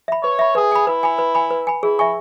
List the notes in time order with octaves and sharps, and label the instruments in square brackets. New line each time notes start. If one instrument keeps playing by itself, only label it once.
[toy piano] E5 B5
[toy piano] B4 [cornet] C#5
[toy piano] E5 B5
[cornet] G#4 [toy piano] B4
[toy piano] G#5 B5
[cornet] E4 [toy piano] B4
[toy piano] G#5 B5
B4
G#5 B5
B4
G#5 B5
[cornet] E4 [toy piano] G#4
[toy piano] E5 G#5 C#6